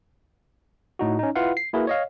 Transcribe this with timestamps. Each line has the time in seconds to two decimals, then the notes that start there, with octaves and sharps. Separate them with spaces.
0.99 A2 D#4 F#4
1.19 C#4 D#4
1.36 E4 F4 B4 F5 F#5
1.57 C7
1.73 A#3 E4 F#4 G#4 A#4 B4
1.87 C#5 D#5 F5